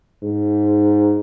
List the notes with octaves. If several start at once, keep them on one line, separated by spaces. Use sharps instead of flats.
G#2